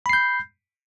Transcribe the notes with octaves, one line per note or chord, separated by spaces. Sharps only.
B5 G6 C7